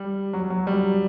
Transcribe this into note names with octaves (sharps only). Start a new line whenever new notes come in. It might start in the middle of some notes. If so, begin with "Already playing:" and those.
Already playing: G3
F#3
F#3
G3